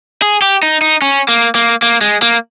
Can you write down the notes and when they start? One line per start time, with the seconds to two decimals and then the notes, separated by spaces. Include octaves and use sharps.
0.22 G#4
0.42 G4
0.63 D#4
0.81 D#4
1.02 C#4
1.28 A#3
1.55 A#3
1.82 A#3
2.01 G#3
2.22 A#3